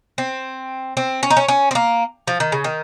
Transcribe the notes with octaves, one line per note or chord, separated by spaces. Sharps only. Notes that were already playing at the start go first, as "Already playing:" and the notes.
C4
C4
C#4
D#4
C#4
C#4
C4
A#3
F3
D#3
C#3
D#3